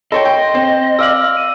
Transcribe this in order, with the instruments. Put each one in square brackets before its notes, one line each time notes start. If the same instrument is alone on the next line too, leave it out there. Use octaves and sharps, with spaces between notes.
[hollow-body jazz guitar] A4 C#5 G5 [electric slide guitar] D#5 [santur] C6
[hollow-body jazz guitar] G5
C4
[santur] D5 F5 [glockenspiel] E6 F#7
[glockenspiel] D#7